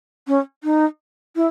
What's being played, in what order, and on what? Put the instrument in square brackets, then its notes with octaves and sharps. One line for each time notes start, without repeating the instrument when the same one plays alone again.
[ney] C#4
D#4
E4